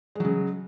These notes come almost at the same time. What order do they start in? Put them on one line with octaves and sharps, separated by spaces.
G#3 F#3 C#3